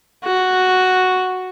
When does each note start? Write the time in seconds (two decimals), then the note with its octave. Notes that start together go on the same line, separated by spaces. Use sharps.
0.24 F#4